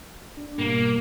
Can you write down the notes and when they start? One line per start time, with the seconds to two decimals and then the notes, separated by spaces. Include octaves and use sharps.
0.37 D4
0.59 G#2 B2 G3 A#3